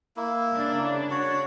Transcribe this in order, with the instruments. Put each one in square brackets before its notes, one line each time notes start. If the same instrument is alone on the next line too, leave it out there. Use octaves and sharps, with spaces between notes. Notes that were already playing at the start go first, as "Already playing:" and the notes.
[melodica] A#3 E4
[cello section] C#3 D4
[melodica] F#4 C#5